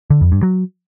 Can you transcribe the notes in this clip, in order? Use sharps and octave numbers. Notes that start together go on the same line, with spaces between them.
D3
F2
G2
F#3